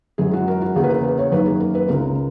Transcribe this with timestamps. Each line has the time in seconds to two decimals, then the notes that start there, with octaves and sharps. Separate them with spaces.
0.18 F#2 E3 G#3 G#4
0.33 F#4
0.48 A#4
0.62 F#4
0.75 E2 C#3 E3 A#3 G#4
0.84 B4
0.90 A#4
1.04 B4
1.19 C#5
1.32 F#2 D#3 A#3 B4
1.47 G#4
1.60 A#4
1.75 B4
1.89 C#2 C#3 G#3 A#4